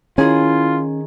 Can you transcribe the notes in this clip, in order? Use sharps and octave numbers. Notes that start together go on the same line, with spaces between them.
D#3 C#4 E4 F4 G#4